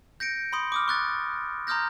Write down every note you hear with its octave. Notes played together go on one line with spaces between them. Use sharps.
G6 A#6 C#7 D7
B5 C6 D#6
D6 D#6 F6
C#6 F#6 A6
A#5 C6 D#6 F6 G6 A#6